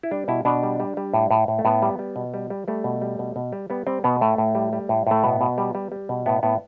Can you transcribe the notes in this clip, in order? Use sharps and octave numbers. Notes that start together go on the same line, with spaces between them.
E4
G3 D4
B2 E4
B2 D4
G3
G3
G3
A2
A2
A2
A3
A2 B3
G3
G3
B2
G3
G3
G3 A3
B2
G3
B2
B2
G3
G3 B3
G3 C4
B2 B3
A2 A3
A2
G3
G3
A2
A2 A3
B2 B3
B2
G3
G3
G3
B2
A2 B3
A2 B3